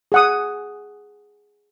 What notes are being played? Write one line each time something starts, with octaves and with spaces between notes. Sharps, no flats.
G#4 F#5 D#6